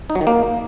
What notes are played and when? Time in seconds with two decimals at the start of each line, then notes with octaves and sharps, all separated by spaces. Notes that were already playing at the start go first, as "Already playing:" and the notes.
0.10 D#4
0.15 F#3
0.21 D#3
0.27 A#3